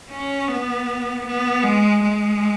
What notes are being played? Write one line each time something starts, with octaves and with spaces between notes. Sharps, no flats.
C#4
B3
B3
G#3
G#3